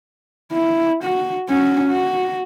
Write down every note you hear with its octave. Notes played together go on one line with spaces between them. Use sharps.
E4
F#4
C#4 F#4
F#4